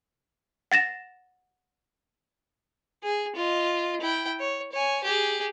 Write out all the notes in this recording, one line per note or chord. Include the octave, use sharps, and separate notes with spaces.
F#5 A6 A#6 E7
G#4
F4 D#5
E4 G5
C#5
C#5 G#5
G4 G#4